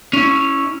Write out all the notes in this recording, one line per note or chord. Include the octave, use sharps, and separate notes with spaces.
C#4 E4